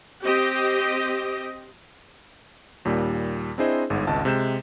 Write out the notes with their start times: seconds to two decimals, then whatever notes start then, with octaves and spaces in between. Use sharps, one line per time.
0.23 C4 G4 D#5
2.85 D#2 A#2 G3
3.58 C4 D4 E4 G#4 C5 D#5
3.90 G1 G#2
4.07 G#1 C#2 D#5 A5
4.25 C3 G#3 G6 E7